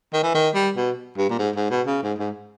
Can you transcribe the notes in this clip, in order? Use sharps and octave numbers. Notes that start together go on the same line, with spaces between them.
D#3
E3
D#3
G3
B2
G2
A#2
G#2
G#2
B2
C#3
G#2
G#2